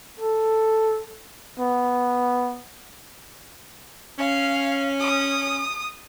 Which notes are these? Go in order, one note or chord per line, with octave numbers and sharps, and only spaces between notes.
A4
B3
C#4 F5
D#6